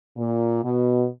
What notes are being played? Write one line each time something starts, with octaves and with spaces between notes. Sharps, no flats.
A#2
B2